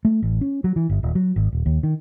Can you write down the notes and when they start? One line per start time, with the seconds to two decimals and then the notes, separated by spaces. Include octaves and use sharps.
0.05 A3
0.22 A1
0.41 C#4
0.64 F#3
0.76 E3
0.89 G1
1.03 D#1
1.15 F#3
1.36 G#1
1.53 D#1
1.66 D#2
1.83 D#3